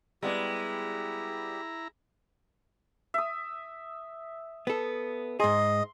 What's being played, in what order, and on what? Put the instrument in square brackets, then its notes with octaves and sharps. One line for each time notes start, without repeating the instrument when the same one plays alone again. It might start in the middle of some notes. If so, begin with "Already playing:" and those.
[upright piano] G3 B3 [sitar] G#3 [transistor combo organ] E4 A#5 [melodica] G4
[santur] E5 D#6
[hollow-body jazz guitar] B3 A4
[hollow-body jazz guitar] G#2 G#4 [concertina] D#5 [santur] C6